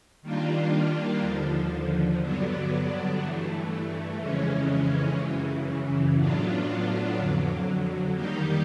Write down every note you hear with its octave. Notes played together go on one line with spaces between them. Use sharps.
D#3 G3 A#3 D4 F4
D#2 D3 F3
G2 D3 F#3 B3 D4
G2 E3 A3
F2 C#3 E3 G#3 C#4
F#2 C#3 E3
A2 F#3 B3 D4 F4
F2 D3 F#3
D#3 G3 A#3 D#4 G4